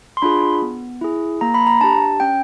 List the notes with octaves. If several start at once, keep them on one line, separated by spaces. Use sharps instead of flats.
C6
D4 F4 G#4 B5
B3
E4 G#4
A#3 A#5
B5
A#5
D4 G4 A5
C#4 G5